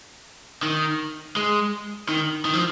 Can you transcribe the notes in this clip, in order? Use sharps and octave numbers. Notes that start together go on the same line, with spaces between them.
D#3
G#3
D#3
D#3
F3